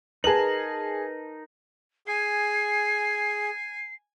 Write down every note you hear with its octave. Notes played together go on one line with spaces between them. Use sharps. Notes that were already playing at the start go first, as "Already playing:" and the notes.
D#4 G#4 A#4 B4 A5 A#5 F#7
G#4 G#5 C7